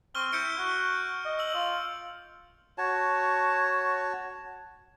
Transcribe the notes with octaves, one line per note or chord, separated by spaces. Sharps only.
C4 C#6 F6 G7
E4 G6 C#7 D7
F#4
D#5
E6 F#7
F4
F#4 C#5 A5